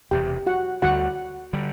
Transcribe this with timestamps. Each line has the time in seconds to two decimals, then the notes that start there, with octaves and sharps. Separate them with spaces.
0.11 E1 E2 C3 G4 G5
0.47 F#4 F#5
0.82 D2 D3 G3 F#4 F#5
1.53 D3 G3